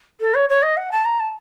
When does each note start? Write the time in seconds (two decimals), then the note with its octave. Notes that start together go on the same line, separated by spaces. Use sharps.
0.20 A4
0.34 C#5
0.49 C#5
0.62 D#5
0.76 F#5
0.91 A5
1.05 A#5
1.19 A5